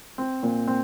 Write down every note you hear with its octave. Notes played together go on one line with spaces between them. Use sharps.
C4
A#2
C4